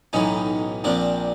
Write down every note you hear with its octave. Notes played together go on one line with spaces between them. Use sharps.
B1 A2 E3 C#4 D#4
A#1 A#2 F3 C4 D4